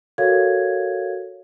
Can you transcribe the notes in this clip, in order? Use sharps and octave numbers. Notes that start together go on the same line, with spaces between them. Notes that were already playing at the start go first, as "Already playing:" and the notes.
F#4 A4 A#4 C#5 F5 G#6